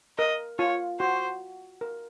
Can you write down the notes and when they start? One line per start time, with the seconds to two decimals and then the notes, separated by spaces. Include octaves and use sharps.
0.18 A#4 D#5
0.59 F4 C#5
1.00 F#4 C5
1.81 A#4